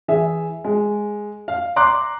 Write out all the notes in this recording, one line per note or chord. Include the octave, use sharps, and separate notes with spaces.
E3 G#4 E5
G#3
F5
A#5 C6 D6 F#6